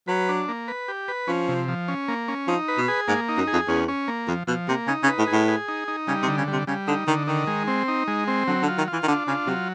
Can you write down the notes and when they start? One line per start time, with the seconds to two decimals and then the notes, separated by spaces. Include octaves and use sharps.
0.08 F#3 B4
0.29 D4
0.48 A#3
0.68 B4
0.88 G4
1.08 B4
1.28 F3 C#4
1.48 C3
1.68 F3
1.88 C#4
2.08 A#3
2.28 C#4
2.48 F3 D#4
2.68 B4
2.78 B2
2.88 G#4
3.08 G#2 A#3
3.29 D#4
3.38 F#2
3.47 G#4
3.53 F2
3.68 E2 C#4
3.88 C#4
4.08 A#3
4.28 F2 F3
4.47 B2 F3
4.68 C3 A#3
4.87 C#3 D#4
5.03 C#3
5.08 B4
5.18 A2
5.27 G#4
5.33 A2
5.48 G#4
5.68 D#4
5.88 D#4
6.08 C#3 G3
6.23 C3
6.28 D3
6.38 C#3
6.48 G3
6.53 C3
6.67 C#3 G3
6.87 D3 D#4
7.08 D3 D#3
7.27 D#3 D#4
7.47 G#3
7.68 C4
7.88 D#4
8.08 G#3
8.28 C4
8.48 D3 F#3
8.63 D3
8.68 F4
8.78 D#3
8.88 F4
8.93 E3
9.03 D#3
9.08 D3 D4
9.27 C#3 F4
9.47 C3 F#3